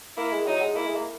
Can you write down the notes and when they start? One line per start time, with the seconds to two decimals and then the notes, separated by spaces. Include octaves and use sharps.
0.17 A#3 E4
0.32 G#3
0.46 F#3 D#4
0.61 G#3
0.75 A#3 E4
0.86 G#3
0.95 A#3